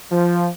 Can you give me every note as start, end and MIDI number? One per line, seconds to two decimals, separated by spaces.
0.10 0.49 53